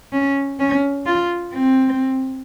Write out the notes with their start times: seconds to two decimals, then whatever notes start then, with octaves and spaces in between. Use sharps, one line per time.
0.13 C#4
0.60 C#4
1.06 F4
1.54 C4